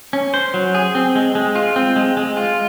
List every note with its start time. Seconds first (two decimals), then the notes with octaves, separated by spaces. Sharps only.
0.13 C#4
0.34 C5
0.54 F#3
0.75 G#4
0.95 C4
1.15 G#3
1.35 G#3
1.55 F4
1.76 C4
1.96 G#3
2.17 G#3
2.37 F4